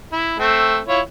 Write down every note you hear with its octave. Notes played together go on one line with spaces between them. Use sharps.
E4
A3 C4
E4 F4 C#5